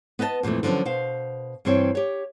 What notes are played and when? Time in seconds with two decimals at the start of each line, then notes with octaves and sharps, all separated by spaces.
0.19 B3 B4 D#5 E5 A5
0.43 F2 A#2 D#3 E3 A3
0.63 D3 F3 F#3 B3 C#4
0.85 B2 C5 F5
1.65 G2 E3 C4 C#5 G5
1.95 G4 C#5